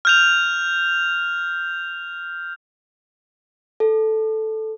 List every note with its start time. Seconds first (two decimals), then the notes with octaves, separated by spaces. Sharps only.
0.05 F6 G6 F7
3.80 A4